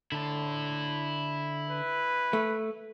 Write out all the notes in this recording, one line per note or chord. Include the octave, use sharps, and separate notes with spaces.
D3 E4 A5
B4
A3